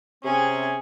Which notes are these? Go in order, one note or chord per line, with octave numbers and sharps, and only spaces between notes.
C3 C4 C#4 G#4